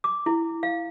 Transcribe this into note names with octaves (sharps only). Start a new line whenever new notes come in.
D6
E4
F5